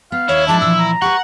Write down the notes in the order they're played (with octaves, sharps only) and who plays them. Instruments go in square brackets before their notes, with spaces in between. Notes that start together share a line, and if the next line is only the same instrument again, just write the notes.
[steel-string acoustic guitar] B3 [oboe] F5
[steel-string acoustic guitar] D#2 [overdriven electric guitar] E4 [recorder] C#5
[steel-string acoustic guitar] F3 G#3 D#4 [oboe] D4 [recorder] A5
[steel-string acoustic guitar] A#2 E3 F3 [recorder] E6
[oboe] A#5
[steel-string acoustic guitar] G4 B4 [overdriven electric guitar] F#5 [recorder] C#6